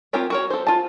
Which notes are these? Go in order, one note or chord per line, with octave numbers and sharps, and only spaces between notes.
C4 F4 G4 A#4 C#5
F#4 A#4 C#5
A4 C5
F4 A5